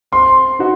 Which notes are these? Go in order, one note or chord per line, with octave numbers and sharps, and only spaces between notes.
C4 C6
D#4 F#4